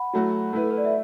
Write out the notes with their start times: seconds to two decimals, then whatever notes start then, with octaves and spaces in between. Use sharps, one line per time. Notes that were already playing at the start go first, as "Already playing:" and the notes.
Already playing: F#5 B5
0.13 F#3 A3 F#4
0.53 A3 E4 B4
0.63 A4
0.71 B4
0.78 D5
0.85 E5